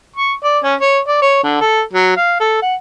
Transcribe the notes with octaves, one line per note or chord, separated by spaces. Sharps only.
C#6
D5
C#4
C#5
D5
C#5
D3
A4
F#3
F5
A4
F#5